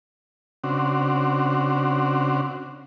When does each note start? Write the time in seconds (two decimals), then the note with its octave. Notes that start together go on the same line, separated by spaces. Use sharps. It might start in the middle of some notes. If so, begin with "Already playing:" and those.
0.64 C#3 C4 D4 F#4